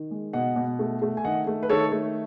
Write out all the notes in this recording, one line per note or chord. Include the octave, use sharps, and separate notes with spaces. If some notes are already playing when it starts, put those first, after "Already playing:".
Already playing: D#3
G#3
B2 D#5 F#5
B2
A3
A3
G#5
D#3 D#5 F#5
A3
B4
D#3 A4 C#5
A3